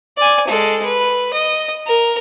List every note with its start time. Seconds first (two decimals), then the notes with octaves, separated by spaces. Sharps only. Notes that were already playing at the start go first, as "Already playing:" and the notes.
0.17 D5 G#5
0.48 G#3 A4
0.85 B4
1.34 D#5
1.86 A#4